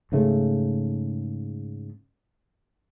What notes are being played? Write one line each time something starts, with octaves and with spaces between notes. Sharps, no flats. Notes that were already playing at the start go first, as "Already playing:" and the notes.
G#2 C#3 A3